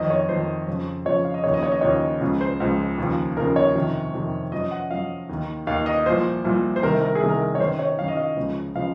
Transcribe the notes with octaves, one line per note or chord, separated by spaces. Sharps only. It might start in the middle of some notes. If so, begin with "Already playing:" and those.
Already playing: F2 D#3 D#5
C#5
F2 D#3 C5
F2 C#3 F3
F2 C#3 F3 C#5
F5
D#5
D#2 C#3 F3 C#5
D#5
C#5
D#5
D#2 C#3 F3 C#5
C#2 C#3 F3
C5
C#2 C#3 F3
D#2 C#3 F3
D#2 C#3 F3 A#4
C#5
F2 C3 D#3
F2 C3 D#3
F#2 F3 D#5
F#5
F#2 F3 F5
D#2 D#3
D#2 D#3 F5
D#5
C2 A#2 F3 C5
C2 A#2 F3
C5
C2 C3 D#3 A#4
A#4
G#4
C2 C3 D#3
A#4
C#5
F#2 D#3 C5
C#5
F#2 D#3 F5
D#5
F5
C#2 C#3 F3
C#3 F3 F5